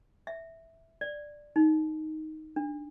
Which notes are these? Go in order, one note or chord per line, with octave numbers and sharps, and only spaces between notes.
E5
D5
D#4
D4